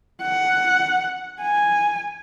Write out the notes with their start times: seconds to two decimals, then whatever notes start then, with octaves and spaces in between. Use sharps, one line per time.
0.22 F#5
1.41 G#5